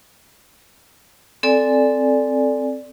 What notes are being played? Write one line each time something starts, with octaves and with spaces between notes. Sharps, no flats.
C4 A4 D5 G#5